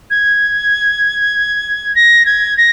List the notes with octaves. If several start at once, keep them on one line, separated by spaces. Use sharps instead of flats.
G#6
A#6
G#6
A#6